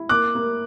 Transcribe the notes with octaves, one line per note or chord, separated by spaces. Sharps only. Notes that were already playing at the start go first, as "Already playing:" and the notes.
Already playing: E4
A#3 D6 F#6
A#3